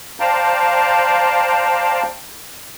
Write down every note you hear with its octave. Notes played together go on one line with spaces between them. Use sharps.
C5 D5 F5 G5 A5 A#5